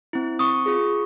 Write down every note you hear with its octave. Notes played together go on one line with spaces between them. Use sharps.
C4 E4
C4 C#6 D#6
F4 G#4